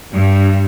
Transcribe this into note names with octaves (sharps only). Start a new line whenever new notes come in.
G2